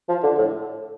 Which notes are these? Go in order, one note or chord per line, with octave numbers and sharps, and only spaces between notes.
F3
D3
A2